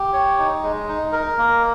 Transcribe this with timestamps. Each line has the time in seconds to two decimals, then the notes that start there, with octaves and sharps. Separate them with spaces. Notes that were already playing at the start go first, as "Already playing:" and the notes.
Already playing: G4
0.13 C#5
0.38 D#4
0.63 G#3
0.88 D#4
1.12 A#4
1.38 A#3